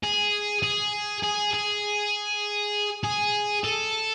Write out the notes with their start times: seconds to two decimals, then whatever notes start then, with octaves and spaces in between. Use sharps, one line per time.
0.03 G#4
0.63 G#4
1.23 G#4
1.54 G#4
3.04 G#4
3.64 A4